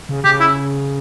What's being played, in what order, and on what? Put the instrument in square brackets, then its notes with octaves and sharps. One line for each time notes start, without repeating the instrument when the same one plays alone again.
[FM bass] C#3
[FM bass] C#3 [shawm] G4
[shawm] E4